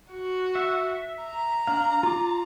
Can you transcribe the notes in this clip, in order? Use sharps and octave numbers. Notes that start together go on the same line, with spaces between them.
F#4
E5
A#5
D4 F5
F4 D6